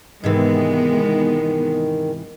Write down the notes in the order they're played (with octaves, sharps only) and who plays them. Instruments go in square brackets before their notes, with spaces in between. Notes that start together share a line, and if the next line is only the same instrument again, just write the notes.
[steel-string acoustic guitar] G#2 C3 E3 [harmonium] D#3 [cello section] G#3 B3 D#4